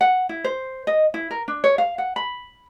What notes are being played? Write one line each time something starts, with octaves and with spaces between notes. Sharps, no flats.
F#5
E4
C5
D#5
E4
A#4
D4
C#5
F5
F#5
B5